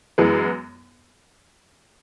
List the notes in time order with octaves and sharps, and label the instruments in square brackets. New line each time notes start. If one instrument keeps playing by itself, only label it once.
[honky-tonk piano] F#2 E3 G#3 B3